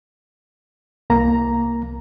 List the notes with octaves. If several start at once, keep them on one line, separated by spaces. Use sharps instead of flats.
C2 A#3 A#5